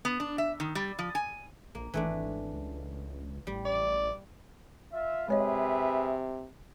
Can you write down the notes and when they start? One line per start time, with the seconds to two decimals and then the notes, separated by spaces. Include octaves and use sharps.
0.05 B3
0.20 D4
0.38 E5
0.60 D#3
0.75 G3
0.99 F3
1.15 G#5
1.75 A#1 A#3
1.94 G#1 E3 A3 D4
2.53 C#2
3.47 A1 G3
3.65 D5
4.92 F4 E5
5.29 C3 G#3 G#4 B4 C#5 D#5 E5